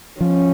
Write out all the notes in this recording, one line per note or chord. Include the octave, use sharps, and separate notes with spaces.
F3 C#4